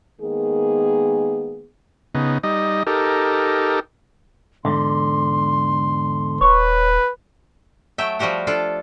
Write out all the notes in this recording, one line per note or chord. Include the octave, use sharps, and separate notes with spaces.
D#3 G#3 A#3 B3 G#4
C#3 B3 D#4
G3 D#4 D#5
D#4 G4 A4 A#4
E2 G#2 D3 C6
D#1 B4 C#5
F#3 A3 E5 G5
F3 G3 F#4 G4 F#5
D4 F4 A4 D5